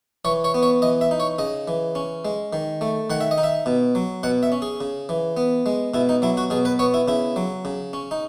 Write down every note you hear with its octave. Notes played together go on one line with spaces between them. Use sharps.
E3 C#5
C#5
B3
C#5
E3 D#5
E5
D#4
C#5
C#3 D#5
E3
C#4
G#3
D#3
A3
D#3 F#5
E5
D#5
D#4
E5
B2
F#3
B2 F#5
E5
C#4
G#4
C#3
E3
B3
G#3
B2 E4
D#4
F#3 E4
F#4
B2 G#4
B4
B3 C#5
E4
C#3 E4
F#3
C#3
C#4
D#4